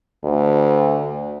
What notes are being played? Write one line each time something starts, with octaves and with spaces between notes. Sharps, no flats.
D2